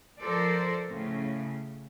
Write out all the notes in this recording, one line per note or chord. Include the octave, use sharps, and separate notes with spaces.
F3 A4 A#4 C5 D5
A2 C#3